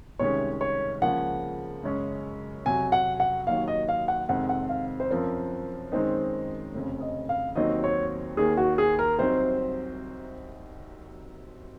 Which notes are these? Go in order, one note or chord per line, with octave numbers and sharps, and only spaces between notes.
C2 C3 D#3 G#3 C#4 C#5
C#5
C#2 C#3 F3 A#3 F#5
F#2 C#3 G#3 C#4
F2 C3 F#3 G#5
F#5
F#5
D#2 D#3 F#3 F5
D#5
F5
F#5
F2 C3 D#3 G#3 C4 F#5
F#5
F5
C5
F#2 F3 C4 A#4
F#2 D#3 G#3 C4 D#4 C5
F1 F2 C#3
D#5
F5
D#2 D#3 F#3 C4 D#4 D#5
C#5
D#2 D#3 A#3 G#4
F#4
G#4
A#4
C2 C3 F#3 C4 D#4 C5